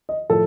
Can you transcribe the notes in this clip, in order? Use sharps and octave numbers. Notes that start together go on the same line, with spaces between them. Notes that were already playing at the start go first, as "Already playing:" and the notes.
D#5
A2 F3 A4